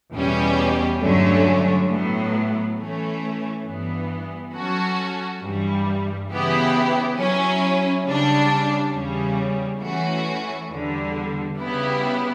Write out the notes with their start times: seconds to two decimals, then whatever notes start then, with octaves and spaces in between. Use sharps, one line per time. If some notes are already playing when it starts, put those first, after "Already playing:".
0.13 E2 B2 G3 C#4 G4
1.01 G2 D3 F#3 A3 C#4
1.88 A2 F#3 B3
2.77 E3 A3 C#4
3.65 G2 E3 B3
4.53 F#3 C#4 F#4 A4
5.41 G2 E3 G3
6.29 C#3 E3 B3 E4 G4
7.18 F#3 C#4 E4
8.05 C#3 G3 D4
8.94 E2 C#3 G3 C#4
9.81 E3 A3 C#4 F#4
10.69 E2 D3 G3
11.57 C#3 G3 B3 E4 G4